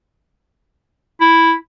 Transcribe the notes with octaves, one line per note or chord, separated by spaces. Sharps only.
E4